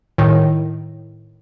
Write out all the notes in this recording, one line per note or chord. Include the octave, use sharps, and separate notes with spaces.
A2 D#3